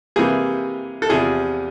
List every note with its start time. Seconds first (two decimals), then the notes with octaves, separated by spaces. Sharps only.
0.16 C3 E3 G3 A#3 G#4
1.02 A4
1.09 E2 C3 F3 G#4